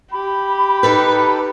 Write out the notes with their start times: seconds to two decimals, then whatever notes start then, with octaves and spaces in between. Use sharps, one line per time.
0.12 G4 B5
0.83 D#4 A4 B4